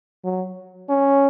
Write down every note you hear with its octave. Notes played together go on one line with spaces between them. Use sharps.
F#3
C#4